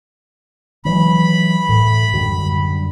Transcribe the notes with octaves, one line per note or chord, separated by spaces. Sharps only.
E3 F#3 G#3 B5
A2
F#2 D3 G3